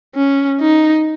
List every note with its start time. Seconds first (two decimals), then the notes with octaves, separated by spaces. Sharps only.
0.15 C#4
0.60 D#4